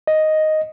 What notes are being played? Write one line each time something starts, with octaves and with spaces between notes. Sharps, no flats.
D#5